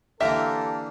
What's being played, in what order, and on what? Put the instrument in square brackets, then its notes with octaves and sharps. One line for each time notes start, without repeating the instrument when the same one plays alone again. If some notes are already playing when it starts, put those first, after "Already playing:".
[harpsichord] D3 E3 A#3 [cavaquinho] G4 F5 A#5 [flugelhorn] A4 [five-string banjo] E5